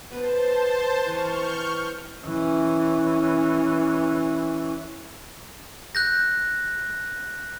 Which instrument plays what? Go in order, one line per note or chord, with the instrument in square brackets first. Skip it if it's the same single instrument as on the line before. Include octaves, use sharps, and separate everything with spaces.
[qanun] B3 B4 A#5 [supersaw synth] C5 A5
[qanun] E3 C4 G#5 [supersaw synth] C#6 F6 G6
[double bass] E3 C#4
[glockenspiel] F#6 G6 A#6